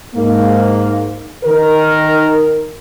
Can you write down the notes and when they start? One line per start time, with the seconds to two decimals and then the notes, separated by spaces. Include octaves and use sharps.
0.15 G#2 A#3
1.44 D#3 A#4